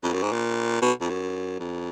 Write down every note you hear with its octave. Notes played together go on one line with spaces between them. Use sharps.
F2
F#2
G#2
A#2
B2
F2
F#2
F2